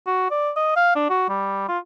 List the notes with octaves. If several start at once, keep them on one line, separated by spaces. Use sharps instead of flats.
F#4
D5
D#5
F5
D4
F#4
G3
F4